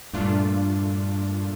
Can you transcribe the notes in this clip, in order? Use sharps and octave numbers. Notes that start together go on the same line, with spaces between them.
G2 A#2 A3 D4 F4